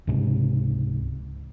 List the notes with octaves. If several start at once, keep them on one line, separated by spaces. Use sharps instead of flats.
C#2 G#2 C3